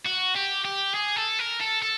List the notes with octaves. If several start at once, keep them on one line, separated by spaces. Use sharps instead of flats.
F#4
G4
G4
G#4
A4
A#4
A4
A4